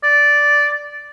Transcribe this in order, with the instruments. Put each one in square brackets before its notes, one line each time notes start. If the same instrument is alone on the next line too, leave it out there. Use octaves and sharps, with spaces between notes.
[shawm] D5